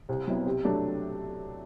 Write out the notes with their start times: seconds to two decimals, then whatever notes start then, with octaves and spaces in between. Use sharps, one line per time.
0.09 C2
0.27 B2 F#3 C4 E4
0.46 C3
0.65 F#3 A3 D4